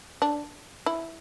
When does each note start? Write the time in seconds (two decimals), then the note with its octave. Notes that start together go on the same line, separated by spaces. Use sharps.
0.22 D4
0.86 E4